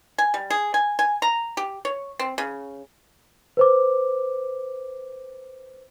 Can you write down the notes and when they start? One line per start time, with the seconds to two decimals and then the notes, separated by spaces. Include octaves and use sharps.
0.18 G#5
0.34 G3
0.50 G#4
0.74 G#5
0.99 G#5
1.22 A#5
1.57 G4
1.85 C#5
2.19 C4
2.38 C#3
3.57 B4 C5 D6